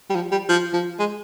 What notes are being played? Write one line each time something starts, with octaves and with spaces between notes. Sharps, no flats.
G3
F3
G3
F3
F3
G#3